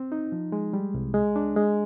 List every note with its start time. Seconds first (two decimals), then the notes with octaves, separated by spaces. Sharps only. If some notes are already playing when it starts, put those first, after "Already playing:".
Already playing: C4
0.12 D#4
0.32 F3
0.52 G#3
0.73 G3
0.94 C2
1.14 G#3
1.36 D4
1.57 G#3